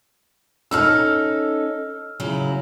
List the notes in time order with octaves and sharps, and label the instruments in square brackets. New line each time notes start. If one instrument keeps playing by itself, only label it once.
[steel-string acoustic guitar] C#4 D#4 A4 [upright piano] E6 F6
[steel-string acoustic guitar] C#3 F#3 E4